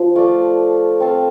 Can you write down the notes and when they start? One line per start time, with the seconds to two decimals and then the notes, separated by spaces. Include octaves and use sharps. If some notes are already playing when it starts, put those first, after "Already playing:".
Already playing: F3 C5
0.16 A3 F4 D5 F5
1.00 C4 A4 F5